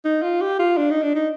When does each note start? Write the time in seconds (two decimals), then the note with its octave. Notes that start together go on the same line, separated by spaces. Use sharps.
0.05 D#4
0.23 F4
0.41 G4
0.60 F4
0.77 D4
0.91 D#4
1.03 D4
1.16 D#4